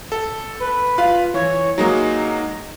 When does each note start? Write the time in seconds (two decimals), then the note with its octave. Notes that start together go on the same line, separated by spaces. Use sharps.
0.12 A4
0.60 B4
0.98 F4 B4 F5
1.34 E3 C#5
1.78 F#3 G#3 A#3 D#4